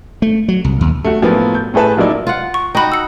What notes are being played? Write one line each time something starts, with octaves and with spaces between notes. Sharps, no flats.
A3
F#3
C2
D#2
A3 F#4
A2 F3 F#3 A#3 B3
G6
A2 A3 G#4 B4 A5
F3 F#3 A#3 D#4 E4 D5
F4 F#5
C#6
D#4 F#4 G5 B5
E6 C#7